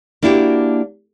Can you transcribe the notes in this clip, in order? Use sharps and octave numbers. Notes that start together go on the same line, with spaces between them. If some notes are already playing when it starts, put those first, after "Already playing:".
A#3 D4 E4 F#4 G4